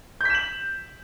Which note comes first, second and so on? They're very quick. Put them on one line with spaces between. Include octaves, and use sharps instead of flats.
G6 B6 E7 F#7